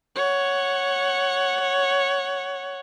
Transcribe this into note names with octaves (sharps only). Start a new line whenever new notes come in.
C#5 F#5